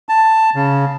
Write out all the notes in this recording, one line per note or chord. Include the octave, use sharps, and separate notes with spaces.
A5
C#3